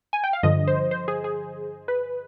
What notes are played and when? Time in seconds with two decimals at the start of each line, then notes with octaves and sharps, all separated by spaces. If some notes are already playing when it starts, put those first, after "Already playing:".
0.13 G#5
0.24 G5
0.33 F5
0.43 G2 D3 F3 D#5
0.67 C5
0.91 C5
1.08 G#4
1.24 G#4
1.88 B4